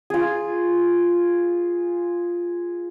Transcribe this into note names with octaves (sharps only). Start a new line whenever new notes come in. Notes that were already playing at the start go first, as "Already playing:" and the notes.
F4 G#4